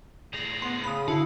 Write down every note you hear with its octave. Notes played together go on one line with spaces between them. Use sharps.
A2 G#4 A#6 F7
B3 C6
C#3 B5 D#6
D3 E4 F#4 F5